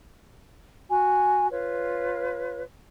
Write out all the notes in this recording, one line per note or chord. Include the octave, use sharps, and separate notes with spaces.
F#4 G#5
F4 B4 C#5